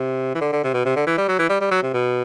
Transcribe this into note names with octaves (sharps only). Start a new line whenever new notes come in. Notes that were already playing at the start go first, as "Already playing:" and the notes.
Already playing: C3
E3
D3
D3
C3
B2
C3
D3
E3
G3
F#3
E3
G3
G3
F#3
C3
B2